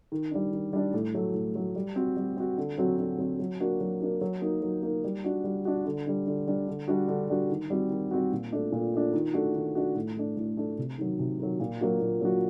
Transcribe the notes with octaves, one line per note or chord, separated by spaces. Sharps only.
D#3
G3 D4
D#3
G3 D4
A2
F#3 A3
A2
F#3 A3
G3
C4 F#4
G3
C4 F#4
D3
F#3 C4 F#4
D3
F#3 C4 F#4
F#3
A#3 D4 F#4
F#3
A#3 D4 F#4
F#3
A#3 D#4
F#3
A#3 D#4
G3
D4 F#4
G3
D4 F#4
D3
G3 D4
D3
G3 D4
D3
G3 D4 F#4
D3
G3 D4 F#4
D#3
G3 C4 F#4
D#3
G3 C4 F#4
A#2
A3 D4
A#2
A3 D4
D#3
A3 D4 F#4
D#3
A3 D4 F#4
A2
A3 D4
A2
A3 D4
C3
D#3 F#3
C3
D#3 F#3
A#2
F#3 A#3 D4 F#4
A#2
F#3 A#3 D4 F#4